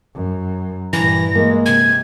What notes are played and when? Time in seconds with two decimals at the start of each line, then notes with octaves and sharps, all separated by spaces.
0.14 F#2
0.93 G2 A#2 E3 A#6
1.35 G#3 A#3
1.66 C3 G#6